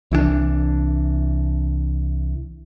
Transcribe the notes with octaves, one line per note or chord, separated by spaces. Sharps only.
C2 E3 F3 D4